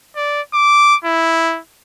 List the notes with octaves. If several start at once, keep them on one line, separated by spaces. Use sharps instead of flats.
D5
D6
E4